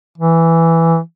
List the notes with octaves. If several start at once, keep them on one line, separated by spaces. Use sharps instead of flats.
E3